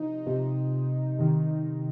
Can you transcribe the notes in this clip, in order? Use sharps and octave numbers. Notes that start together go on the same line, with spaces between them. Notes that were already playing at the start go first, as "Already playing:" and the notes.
Already playing: C3 F3 D#4
C3 F3
C3 D#3